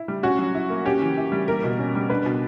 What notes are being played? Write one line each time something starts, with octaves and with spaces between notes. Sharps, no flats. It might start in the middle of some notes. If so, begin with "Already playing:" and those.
Already playing: E4
G3
C#4 F#4
F#3
E4
A#3
C#4 G4
E3
E4
G3
A#3 A#4
B2
C#4
G3
D4 B4
B2